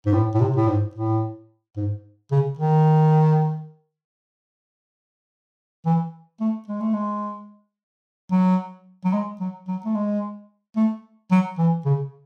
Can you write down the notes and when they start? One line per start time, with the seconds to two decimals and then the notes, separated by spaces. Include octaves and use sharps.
0.06 G#2
0.14 A2
0.34 A2
0.41 C3
0.56 A2
0.68 G#2
0.95 A2
1.77 G#2
2.31 C#3
2.58 D#3
5.85 E3
6.40 A3
6.67 G#3
6.80 A3
6.94 G#3
8.31 F#3
9.05 F#3
9.13 G#3
9.40 F#3
9.68 F#3
9.85 A3
9.95 G#3
10.76 A3
11.31 F#3
11.58 E3
11.85 C#3